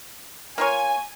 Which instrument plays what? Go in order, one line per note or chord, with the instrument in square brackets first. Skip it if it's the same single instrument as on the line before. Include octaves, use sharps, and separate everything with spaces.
[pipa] A#3 F4 C#5 [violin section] G#5